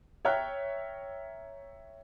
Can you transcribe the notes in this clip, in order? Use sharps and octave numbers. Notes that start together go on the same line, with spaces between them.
C#5 E5 G5 A#5 F6 F#6